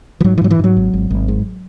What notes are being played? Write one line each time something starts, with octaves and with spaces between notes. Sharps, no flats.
E3
G#2 F#3
E3
G#2 F#3
E3
G#2 F#3
G#1
G#1
G#1
G#2